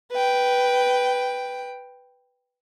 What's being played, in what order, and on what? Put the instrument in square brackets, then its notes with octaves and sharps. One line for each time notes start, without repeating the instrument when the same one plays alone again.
[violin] B4 G5